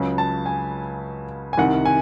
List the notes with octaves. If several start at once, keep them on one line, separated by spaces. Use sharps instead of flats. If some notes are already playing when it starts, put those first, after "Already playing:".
Already playing: C#2 C#3 F#3
A5
G#5
G#5
C2 C3 D#3 F#5
G#5